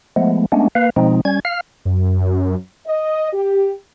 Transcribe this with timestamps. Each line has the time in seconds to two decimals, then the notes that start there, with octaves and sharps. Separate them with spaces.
0.16 F3 G#3 A3 B3
0.52 G#3 A3 B3 C#4 D4
0.75 A#3 B4 F5
0.96 B2 F3 G#3 C4 D#4
1.25 G3 C#4 G#6
1.45 F5 F6
1.85 F#2
2.87 D#5
3.33 G4